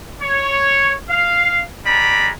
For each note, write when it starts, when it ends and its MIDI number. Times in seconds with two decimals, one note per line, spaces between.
0.21 0.93 73
1.10 1.63 77
1.85 2.30 55
1.85 2.30 56
1.85 2.30 74
1.85 2.30 82
1.85 2.30 83